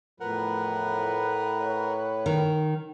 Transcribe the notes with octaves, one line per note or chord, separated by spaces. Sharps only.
E2 A2 F3 A#4 B4 F#5
C#5
D#3